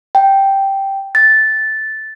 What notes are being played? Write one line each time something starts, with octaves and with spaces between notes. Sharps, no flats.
G5
A6